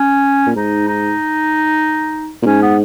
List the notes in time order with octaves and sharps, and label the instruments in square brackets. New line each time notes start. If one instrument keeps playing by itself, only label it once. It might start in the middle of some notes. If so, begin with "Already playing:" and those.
Already playing: [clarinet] C#4
[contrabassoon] A#2
[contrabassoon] G#2 [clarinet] D#4
[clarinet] D#4
[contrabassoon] A#2
[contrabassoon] G#2 [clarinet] C#4
[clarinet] B3